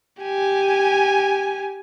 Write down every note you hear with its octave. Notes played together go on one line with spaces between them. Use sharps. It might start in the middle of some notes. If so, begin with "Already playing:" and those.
G4 G#5